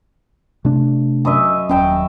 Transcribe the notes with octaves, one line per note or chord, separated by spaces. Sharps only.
C3 A3 D4
F#2 D#5 E5
D#1 F#2 C#4 G5 A5